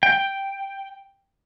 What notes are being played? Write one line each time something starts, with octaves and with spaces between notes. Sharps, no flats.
G5